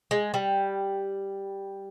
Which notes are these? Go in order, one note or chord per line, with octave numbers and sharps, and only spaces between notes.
G#3
G3